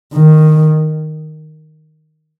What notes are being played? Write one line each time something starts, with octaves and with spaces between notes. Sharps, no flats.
D#3